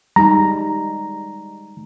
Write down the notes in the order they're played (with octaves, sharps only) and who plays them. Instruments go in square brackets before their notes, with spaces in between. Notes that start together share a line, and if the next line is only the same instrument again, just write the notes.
[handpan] G3 G#3 D#4 [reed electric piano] A#5